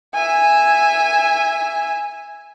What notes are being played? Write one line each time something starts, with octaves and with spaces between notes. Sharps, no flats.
E5 G#5